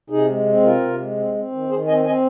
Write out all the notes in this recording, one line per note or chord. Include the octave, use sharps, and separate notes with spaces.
C3 D#4 G#4
G#3
C4
C3 F4 A#4
C3
G#3
C4
C4
D#3
D#3 G#4 C5
C4 D#5 G#5
C4 D#5 G#5